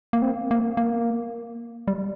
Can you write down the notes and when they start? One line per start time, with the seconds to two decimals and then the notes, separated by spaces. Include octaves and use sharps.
0.13 A#3
0.22 C4
0.51 A#3
0.77 A#3
1.88 G3